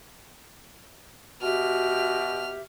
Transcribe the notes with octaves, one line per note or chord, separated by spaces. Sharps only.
B2 F#4 G4 E5 F6